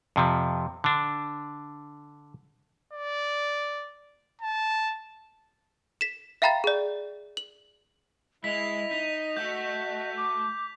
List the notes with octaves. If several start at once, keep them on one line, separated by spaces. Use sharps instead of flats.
F2 C3 F3
D3 D4
D5
A5
B6 E7
E5 F5 G5 A#5 B5 A6
G#4 D5
F#7
G#3 E4 D#5 B6 F7
D#4 B6
A3 F#4 G6
D6